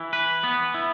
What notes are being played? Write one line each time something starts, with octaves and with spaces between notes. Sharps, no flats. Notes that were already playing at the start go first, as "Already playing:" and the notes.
Already playing: E3 E4
B4
B3
E4